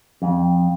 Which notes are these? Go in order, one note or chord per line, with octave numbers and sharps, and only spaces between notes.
F2